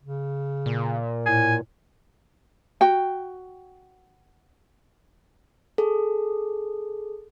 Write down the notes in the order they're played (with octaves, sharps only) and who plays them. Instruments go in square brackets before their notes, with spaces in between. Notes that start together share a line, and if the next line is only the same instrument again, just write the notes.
[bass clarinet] C#3
[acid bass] A#2
[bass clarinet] A2 [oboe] G#5
[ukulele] F#4 G5
[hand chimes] G#4 A4